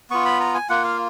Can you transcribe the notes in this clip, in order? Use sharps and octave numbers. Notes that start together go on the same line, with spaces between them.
B3 F4 C#6
B5
A#5
G#5
A#3 F4 F#5
F5